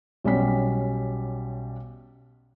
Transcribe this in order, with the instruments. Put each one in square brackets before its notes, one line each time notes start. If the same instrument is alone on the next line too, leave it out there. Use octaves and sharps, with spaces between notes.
[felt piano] B1 G3 C#4 B6